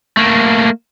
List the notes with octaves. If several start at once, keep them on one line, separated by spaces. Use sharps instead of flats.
A3 A#3